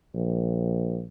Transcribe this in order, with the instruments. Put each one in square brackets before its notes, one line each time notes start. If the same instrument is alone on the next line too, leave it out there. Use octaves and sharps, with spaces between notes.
[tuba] A#1